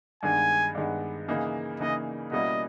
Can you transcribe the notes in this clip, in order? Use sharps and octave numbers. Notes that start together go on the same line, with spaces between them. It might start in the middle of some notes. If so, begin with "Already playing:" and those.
G2 D#3 G#3 B3 G#5
G2 D#3 G#3 B3
C#3 E3 A#3 D#4 G#4
C#3 E3 A#3 D#4 G#4 D#5
B2 G3 A#3 C#4 E4 D#5